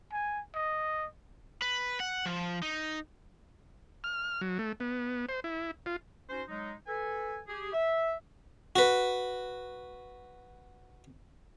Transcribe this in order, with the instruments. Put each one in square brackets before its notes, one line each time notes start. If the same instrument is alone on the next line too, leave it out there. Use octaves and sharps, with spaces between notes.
[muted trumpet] G#5
D#5
[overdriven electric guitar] B4
F#5
F3
D#4
[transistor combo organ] F6
F#3
A3
B3
C5
E4
F4
[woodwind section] C#4 D#4 F#4 C5
F#3 G#3 D#4
A4 B4 G#5
G4 G#4
E5
[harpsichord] F#4 B4